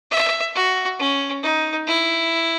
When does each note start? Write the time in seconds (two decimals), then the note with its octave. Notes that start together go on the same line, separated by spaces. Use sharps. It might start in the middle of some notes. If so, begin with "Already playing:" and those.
0.11 E5
0.55 F#4
0.99 C#4
1.43 D#4
1.88 E4